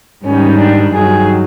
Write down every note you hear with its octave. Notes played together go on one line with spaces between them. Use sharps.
G#2 D#3 G3 C#4
D4
G2 D#3 F#3 G#4